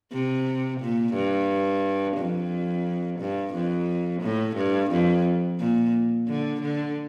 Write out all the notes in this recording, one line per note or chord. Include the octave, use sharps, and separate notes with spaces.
C3
A#2
G2
F2
G2
F2
A2
G2
F2
A#2
D3
D3